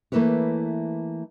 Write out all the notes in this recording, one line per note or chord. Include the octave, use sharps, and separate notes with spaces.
E3 A3 A#3 E4 B4 C#5